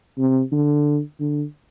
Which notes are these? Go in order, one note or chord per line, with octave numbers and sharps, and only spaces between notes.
C3
D3
D3